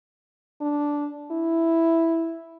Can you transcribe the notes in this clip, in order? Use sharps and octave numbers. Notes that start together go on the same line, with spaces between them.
D4
E4